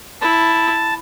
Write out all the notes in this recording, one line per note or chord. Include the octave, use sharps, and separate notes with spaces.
E4 A5